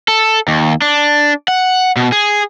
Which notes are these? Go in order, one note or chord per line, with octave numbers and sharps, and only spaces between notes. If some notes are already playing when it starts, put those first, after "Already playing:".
A4
D#2
D4
F#5
B2
G#4